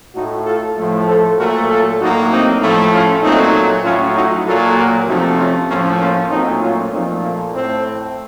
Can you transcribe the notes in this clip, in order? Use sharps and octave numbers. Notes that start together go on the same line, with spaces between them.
A2 A3 D#4 F#4
F4 A4
A2 F3 A3
A4 C5
A#2 F#3 A3 F#4 A#4
F4 A4
A2 F#3 A#3 D#4 F#4
C4 D#4
A2 F3 A3
C#4 F4
A#2 F#3 A3 C4 D#4
A2 F#3 A3 C#4 F4
D#4 F#4
A#2 F#3 A#3 F4 A4
F#4 A#4
C3 F3 A3 D#4 F#4
C#4 F4
A2 F3 A3 A#3 C#4
A#3 C#4
A#2 F#3 A3 C4 D#4
C#4 F4
A#2 F3 A3 C4 D#4
A#3
A2 A3 C4